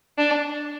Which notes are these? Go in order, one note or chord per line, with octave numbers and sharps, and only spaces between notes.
D4